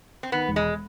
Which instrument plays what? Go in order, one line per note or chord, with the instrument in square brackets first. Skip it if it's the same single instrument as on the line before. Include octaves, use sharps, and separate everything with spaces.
[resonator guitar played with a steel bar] C4
[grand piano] D#3 [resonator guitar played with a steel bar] B3
[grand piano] E1
[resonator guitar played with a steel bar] G#3